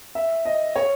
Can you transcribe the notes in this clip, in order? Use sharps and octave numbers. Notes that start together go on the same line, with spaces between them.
E5
D#5
C#5